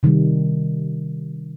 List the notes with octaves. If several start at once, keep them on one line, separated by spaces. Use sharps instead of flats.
C3 D#3 G3